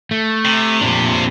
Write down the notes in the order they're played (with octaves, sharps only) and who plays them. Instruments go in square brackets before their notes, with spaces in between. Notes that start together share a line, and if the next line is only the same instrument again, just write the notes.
[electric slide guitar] A3
[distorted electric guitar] C3
[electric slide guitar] F2 A#2 D4